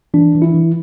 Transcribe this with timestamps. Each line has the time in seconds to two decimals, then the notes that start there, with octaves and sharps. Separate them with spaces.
0.14 E3 D4
0.35 E3
0.42 E4
0.55 E3